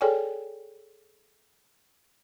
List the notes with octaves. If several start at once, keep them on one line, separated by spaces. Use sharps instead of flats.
G#4 A4 C#5 D5 G5 G#5